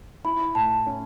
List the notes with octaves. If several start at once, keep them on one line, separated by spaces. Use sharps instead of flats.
E4 B5
A2 A5
C#4